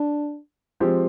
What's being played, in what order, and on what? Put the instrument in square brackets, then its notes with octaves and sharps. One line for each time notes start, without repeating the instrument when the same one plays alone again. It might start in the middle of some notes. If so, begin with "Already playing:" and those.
Already playing: [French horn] D4
[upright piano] F3 G#3 C4 G4